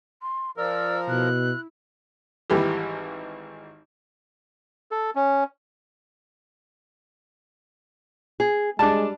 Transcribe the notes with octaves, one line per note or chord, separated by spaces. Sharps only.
C6
F3 A#4 D5 E6
B2 E4 F#6
G#1 E3 G3 G4
A4
C#4
G#4
G3 G#3 D4 A5